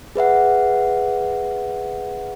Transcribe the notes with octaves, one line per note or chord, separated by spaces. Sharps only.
G#4 B4 E5 F#5